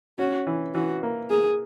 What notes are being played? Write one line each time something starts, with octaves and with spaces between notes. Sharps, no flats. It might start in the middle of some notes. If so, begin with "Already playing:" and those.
C#4 F#4
E3
E3 F#4
A#3
A#3 G#4